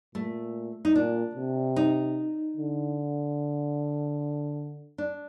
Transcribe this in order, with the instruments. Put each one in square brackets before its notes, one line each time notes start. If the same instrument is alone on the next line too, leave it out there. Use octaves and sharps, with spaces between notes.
[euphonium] A#2 [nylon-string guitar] A3
[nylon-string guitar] D#4
[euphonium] A#2 [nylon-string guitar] D4
[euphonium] C3
[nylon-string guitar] D#4
[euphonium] D3
[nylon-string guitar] D4